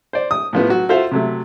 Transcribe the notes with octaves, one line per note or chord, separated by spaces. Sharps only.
C5 D5
D#6
A2 F3 B3
F#3 F#4
F4 F#4 A4 C5 E5 F5
C3 F#3 A3